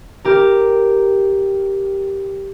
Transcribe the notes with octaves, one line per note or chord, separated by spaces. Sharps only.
G4 A#4